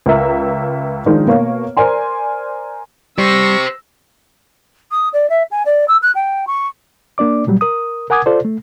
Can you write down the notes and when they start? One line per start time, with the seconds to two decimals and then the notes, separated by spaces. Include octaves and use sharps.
0.06 C#2 A#4 E5 A#5
1.06 D#3 F3 G#3 D4
1.27 B2 A#3 C#5 F5
1.77 A#4 C5 D5 G#5 C6
3.18 G3 G4 C5 C#6 E6 A#6
4.91 D#6
5.13 D5
5.29 E5
5.51 G#5
5.65 D5
5.88 E6
6.02 F#6
6.15 G5
6.47 C#6
7.18 A#3 D4 D5 D6
7.47 A#2 F#3 G3
7.61 A#4 D#6
8.10 A#4 F#5 G#5 D6 D#6 G#6
8.26 F4 A4 C5 D5
8.45 A3